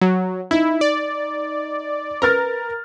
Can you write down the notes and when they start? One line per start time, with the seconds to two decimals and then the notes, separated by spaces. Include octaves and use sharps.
0.01 F#3
0.51 D#4 E4
0.81 D5
2.22 A#4 B4 F6 A6